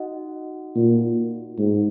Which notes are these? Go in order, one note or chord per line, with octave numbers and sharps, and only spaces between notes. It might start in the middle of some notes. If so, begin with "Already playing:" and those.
Already playing: D#4 F#4 D#5 F#5
A#2
G#2